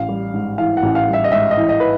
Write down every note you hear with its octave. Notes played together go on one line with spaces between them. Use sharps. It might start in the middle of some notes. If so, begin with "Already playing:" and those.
Already playing: A1 F5
G3
G#2
E3 F5
F#5
A1
F5
G3
E5
D#5
G#2 E5
D#5
E3
D#5
B4